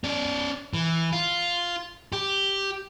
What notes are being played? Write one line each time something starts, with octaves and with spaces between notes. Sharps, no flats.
C#4 D5
E3
F4
G4